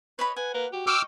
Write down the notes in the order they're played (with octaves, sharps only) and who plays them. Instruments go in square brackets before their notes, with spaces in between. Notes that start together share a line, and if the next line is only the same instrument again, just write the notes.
[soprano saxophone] B4 [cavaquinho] C#5 D#5 B5
[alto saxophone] B4 [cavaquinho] F#5 [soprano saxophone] G#5
[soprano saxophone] A#3 [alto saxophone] B4
[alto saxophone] F#4 [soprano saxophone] G4
[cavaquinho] D#5 C#6 [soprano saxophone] G5 [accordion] D6 E6 F6